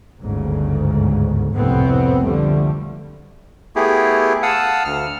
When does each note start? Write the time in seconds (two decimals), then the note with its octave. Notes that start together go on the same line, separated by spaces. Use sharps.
0.22 G1 D2 G#2 C#3
1.53 C2 F2 A2 C3 B3 C4
2.24 D3 F3 G3 A3
3.76 A3 B3 E4 G4 G#4
4.43 F5 F#5 A5 D#6 E6
4.85 D2 F6